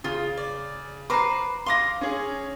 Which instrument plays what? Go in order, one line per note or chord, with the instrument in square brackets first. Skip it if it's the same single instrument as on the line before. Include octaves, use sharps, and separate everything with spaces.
[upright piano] C#3 [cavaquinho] F4 D#6
[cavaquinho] D5
[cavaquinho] B4 C5 A#5 [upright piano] D6 C7
[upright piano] F5 A#6 [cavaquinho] C6 D6 D#6
[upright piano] C#4 G#4